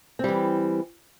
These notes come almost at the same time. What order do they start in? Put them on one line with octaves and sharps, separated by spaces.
C4 G3 E3